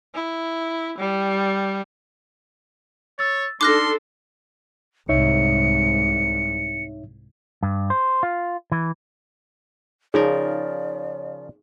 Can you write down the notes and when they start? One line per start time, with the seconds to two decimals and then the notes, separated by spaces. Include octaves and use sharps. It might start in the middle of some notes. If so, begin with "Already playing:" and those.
0.15 E4
0.98 G3
3.19 C#5 E6 A6
3.61 D4 D#4 A4 C6 D6 F6 F#6 A#6
5.09 C2 G#2 D#4 C#5 E5 C#7
7.63 G2
7.90 C5
8.23 F4
8.72 E3
10.14 C#3 F3 D#4 G#4 A#4 C#5 D5